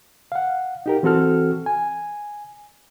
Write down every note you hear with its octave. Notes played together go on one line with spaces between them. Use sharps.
F5 F#5
D#4 G4 A#4
E3 C4 F#4 A4 F6
G#5